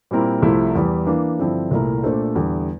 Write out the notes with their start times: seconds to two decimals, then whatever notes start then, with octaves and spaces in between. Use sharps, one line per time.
0.11 A#2 G3 C4 E4 A#4
0.42 C2 C3 F3 A3 E4
0.75 E2 E3 G3
1.07 E3 A#3 D4
1.39 G2 D3 F3 C4 E4
1.71 C2 A#2 A3 E4 A#4
2.03 A#2 A3 D4 A4 C5
2.35 E2 D3 G3